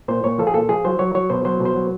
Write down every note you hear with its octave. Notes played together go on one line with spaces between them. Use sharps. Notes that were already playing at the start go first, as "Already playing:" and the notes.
A#2 C5
A#2 C#5
F3 A4
G#4
A#2 A4
F3 G#4
F#3 C5
F#3 C#5
F#3 C#5
B2 C5
F#3 C5
B2
C5
F#3